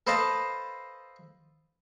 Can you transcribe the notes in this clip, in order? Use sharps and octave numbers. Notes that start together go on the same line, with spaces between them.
A4 B4 C5 D#5 F5 A5